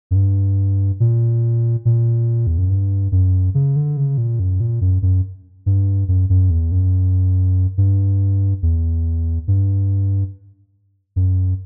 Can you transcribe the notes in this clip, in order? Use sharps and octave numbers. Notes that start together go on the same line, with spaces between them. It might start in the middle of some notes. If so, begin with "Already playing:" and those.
F#2
G2
A#2
A#2
E2
F#2
G2
F#2
C#3
D3
C#3
A#2
F#2
A#2
F#2
F#2
G2
F#2
F#2
E2
F#2
G2
E2
G2
F#2